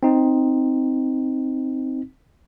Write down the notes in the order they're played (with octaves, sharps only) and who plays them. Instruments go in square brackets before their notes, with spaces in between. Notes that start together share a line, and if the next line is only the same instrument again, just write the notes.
[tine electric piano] C4 D#4